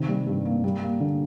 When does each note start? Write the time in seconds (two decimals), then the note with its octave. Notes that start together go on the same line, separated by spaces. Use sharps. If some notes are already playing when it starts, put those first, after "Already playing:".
Already playing: C3 D#3
0.08 G3
0.27 G2
0.45 A#3
0.64 G3
0.82 A#3
1.00 D3